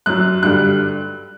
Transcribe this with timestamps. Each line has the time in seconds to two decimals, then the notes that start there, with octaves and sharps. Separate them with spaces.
0.06 F#2 F#3 F#6
0.43 G2 D3 G3 F#6